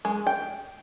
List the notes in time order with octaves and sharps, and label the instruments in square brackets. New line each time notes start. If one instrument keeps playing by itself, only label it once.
[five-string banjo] G#3
G5